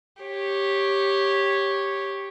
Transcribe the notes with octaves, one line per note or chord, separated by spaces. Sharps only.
G4 C#5